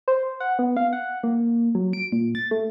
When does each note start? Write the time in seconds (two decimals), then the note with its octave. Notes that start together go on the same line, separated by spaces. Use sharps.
0.08 C5
0.40 F#5
0.59 B3
0.77 F5
0.93 F#5
1.24 A#3
1.75 F#3
1.93 D7
2.12 A#2
2.35 A6
2.51 A3